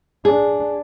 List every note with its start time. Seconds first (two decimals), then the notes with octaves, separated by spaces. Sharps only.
0.25 D4 G#4